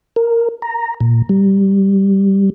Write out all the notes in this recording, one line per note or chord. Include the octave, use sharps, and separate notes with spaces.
A#4
A#5
A#2
G3